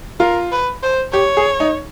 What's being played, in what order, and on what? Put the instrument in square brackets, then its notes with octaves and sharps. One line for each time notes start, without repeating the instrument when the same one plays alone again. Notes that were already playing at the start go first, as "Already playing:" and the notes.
[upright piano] F4 [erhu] A#4
[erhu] B4
C5
[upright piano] G4 [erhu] C#5
[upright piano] G#4
D#4